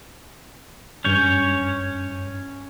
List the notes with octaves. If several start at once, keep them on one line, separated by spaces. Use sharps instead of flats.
G2 C#4 C#5 G6